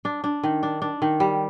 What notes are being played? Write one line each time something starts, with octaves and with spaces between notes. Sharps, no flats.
D4
D4
D#3
D4
D4
D#3
G3